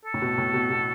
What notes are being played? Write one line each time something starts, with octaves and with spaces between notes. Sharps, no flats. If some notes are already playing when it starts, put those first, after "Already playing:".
A4
A2
B2
A2
B2
B2